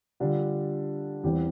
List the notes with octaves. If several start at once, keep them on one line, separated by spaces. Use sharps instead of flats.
D3 G3 D4 F4
E2 E3 G3 C4 G4